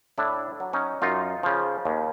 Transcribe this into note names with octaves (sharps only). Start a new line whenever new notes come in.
A2 D4 E4
F#3
C#4 D#4
F#2 D#4 F4
C#3 F3
D#2